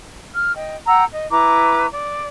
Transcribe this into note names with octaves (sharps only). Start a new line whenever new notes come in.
F6
D#5 G5
F#5 G5 A#5 E6
D#5
E4 B4 A#5 D6
D5